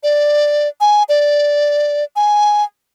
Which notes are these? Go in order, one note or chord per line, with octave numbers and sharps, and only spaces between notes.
D5
G#5
D5
G#5